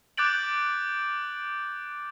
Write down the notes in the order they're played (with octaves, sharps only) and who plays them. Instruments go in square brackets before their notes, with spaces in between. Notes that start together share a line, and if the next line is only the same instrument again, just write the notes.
[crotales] D6 F#6 G6 A6 D7 F#7